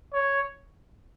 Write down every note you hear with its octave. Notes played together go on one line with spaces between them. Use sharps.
C#5